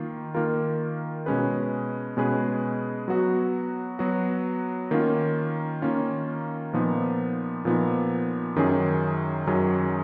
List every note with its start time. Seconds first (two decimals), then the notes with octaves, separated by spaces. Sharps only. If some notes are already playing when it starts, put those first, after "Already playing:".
Already playing: D#3 A#3 F4
0.34 D#3 A#3 F4 A#4
1.26 B2 G#3 C#4 G#4 B4
2.17 B2 G#3 C#4 G#4 B4
3.08 F#3 B3 F#4
3.99 F#3 B3 F#4
4.91 D#3 A#3 C#4 F4
5.82 D#3 A#3 C#4 F4
6.73 A#2 F3 B3 D#4
7.65 A#2 F3 B3 D#4
8.56 F#2 D#3 F#3 C#4 G#4
9.47 F#2 D#3 F#3 C#4 G#4